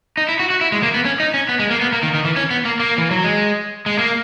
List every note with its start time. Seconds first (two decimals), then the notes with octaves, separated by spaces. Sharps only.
0.17 D#4
0.29 E4
0.39 F#4
0.50 F#4
0.61 E4
0.72 G#3
0.83 A#3
0.94 B3
1.05 C#4
1.20 D#4
1.34 C#4
1.49 B3
1.59 G#3
1.71 A#3
1.81 B3
1.93 A#3
2.03 D#3
2.14 D#3
2.25 E3
2.36 C#4
2.51 B3
2.65 A#3
2.80 A#3
2.98 E3
3.11 F#3
3.24 G#3
3.86 G#3
3.99 A#3